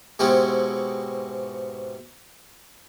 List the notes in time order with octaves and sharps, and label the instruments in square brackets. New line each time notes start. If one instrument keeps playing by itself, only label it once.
[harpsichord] G#2 B2 C4 C#4 E4 G4